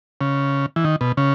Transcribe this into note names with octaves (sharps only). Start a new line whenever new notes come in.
C#3
E3
D#3
B2
C#3